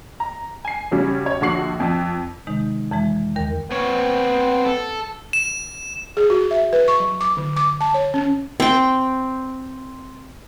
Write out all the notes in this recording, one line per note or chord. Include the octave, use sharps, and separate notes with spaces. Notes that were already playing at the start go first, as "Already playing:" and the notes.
A#5
G#5 C7
C#3 F#3 G3 C#4
C#5
A#1 D3 F#4 C#6 C7 F#7
F2
C3 D#3 G#3 D#4
F2 E3 G#3
D#2 D#3 A#4
B3 C4 C#5
A4
E7
G#4
F#4
E5
B4
C#6
F#3
D6
D3
D6
A5
C#5
C#4
C4 G5